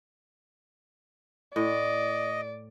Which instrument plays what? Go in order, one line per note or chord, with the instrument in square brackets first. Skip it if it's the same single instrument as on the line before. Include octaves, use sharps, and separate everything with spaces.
[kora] A2 [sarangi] D5 [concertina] D#5